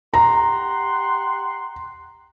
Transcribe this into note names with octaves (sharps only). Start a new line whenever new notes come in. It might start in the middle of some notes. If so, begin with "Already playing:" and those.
G4 F#5 A#5 C6